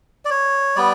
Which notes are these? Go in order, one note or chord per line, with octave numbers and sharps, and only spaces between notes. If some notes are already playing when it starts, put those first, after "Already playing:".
D5
C#5
G3 B3 D5